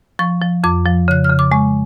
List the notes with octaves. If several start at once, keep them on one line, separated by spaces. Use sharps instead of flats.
F3 C#6
F3
F2 D6
F3
C#3 F#6
F6
C#3
D6
G#3 C#6